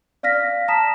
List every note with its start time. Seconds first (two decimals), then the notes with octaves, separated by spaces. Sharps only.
0.23 D5 F5 F6 A#6 B6
0.68 A5 A#5 D#6 B6 E7